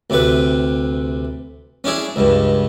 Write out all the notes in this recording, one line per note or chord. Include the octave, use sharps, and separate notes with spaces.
D2 C3 B4
C#4 D4 E4 G#4
C#2 G2